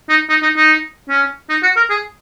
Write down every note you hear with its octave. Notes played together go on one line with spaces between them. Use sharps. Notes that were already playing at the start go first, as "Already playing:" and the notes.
D#4
D#4
D#4
D#4
C#4
D#4
F#4
A#4
G#4